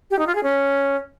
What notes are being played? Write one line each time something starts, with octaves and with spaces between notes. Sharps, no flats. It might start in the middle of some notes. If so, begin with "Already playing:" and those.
G4
D#4
F4
G#4
C#4